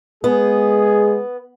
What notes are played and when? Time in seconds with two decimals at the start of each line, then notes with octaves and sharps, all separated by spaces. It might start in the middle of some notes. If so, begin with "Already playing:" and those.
0.24 G#3 B3 G#4